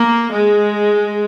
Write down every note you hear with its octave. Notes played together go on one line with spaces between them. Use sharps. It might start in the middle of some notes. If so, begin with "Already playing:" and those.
Already playing: A#3
G#3